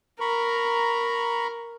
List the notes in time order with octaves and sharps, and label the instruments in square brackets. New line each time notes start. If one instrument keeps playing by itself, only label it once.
[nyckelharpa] A#4 [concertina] A#5 B5 C#6